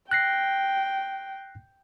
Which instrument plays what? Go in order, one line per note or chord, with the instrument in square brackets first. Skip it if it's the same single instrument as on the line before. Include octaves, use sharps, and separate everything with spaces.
[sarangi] G5 [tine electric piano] F#6 A#6 C7